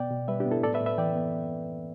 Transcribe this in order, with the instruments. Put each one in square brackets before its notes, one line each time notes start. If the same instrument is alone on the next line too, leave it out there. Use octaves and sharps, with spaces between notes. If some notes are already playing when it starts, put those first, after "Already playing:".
Already playing: [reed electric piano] B2 B3 D5 G5
B2
G3 B4 E5
D4 G4
B3
E4 A4
A2 A4 D5
B4 E5
A2
B4 E5
E3 D5 G5
B3